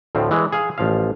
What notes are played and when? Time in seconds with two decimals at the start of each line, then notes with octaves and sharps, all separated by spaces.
0.15 D2 A2 F3 C4
0.31 E3 G#3
0.52 G#4 F5
0.78 A1 F3 F5